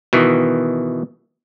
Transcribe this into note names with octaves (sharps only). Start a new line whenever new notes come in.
B2 D#3 E3